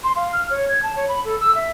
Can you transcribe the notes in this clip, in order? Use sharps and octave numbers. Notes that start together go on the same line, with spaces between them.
C6
F5
F6
C#5
G#6
A5
C#5
B5
A4
E6
E5